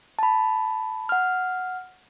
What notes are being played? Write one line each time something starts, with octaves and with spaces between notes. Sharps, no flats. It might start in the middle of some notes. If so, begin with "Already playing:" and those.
A5 B5
F#5 F6